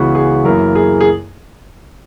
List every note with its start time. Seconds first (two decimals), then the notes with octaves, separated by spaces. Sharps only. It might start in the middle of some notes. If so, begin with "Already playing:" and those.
Already playing: C#2 C#3 E3 B3 E4 F#4
0.15 G#4
0.44 F#2 E3 A#3 E4 A#4
0.75 G#4
1.01 G#4